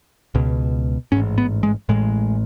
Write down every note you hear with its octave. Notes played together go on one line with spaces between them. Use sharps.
C#2 B2
A1 G#2 C#4
B3
G#3
A1 A2 G#3